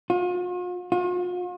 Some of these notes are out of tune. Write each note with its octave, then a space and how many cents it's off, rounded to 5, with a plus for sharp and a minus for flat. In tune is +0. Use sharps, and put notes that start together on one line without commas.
F4 +45
F4 +45